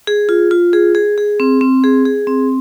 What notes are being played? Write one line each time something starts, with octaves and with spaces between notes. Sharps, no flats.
G#4
F4
F4
G#4
G#4
G#4
C4
C4
G#4
G#4
C4